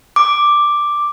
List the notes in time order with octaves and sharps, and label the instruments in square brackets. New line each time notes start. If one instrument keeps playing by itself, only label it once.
[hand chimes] D6